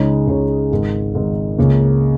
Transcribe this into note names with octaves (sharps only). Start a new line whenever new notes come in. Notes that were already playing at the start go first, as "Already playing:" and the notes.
Already playing: C#2 C#3 G#3 D#4 C#5
C#2 C#3 G#3 D#4 C#5
G#1 G#2 D#3
G#1 G#2 D#3
C#2 C#3 A#3